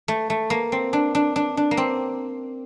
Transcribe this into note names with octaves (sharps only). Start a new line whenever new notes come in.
A3
A3
A#3
C4
D4
D4
D4
D4
A#3
C4